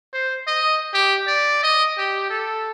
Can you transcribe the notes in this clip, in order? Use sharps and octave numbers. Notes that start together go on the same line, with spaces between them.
C5
D#5
G4
D5
D#5
G4
A4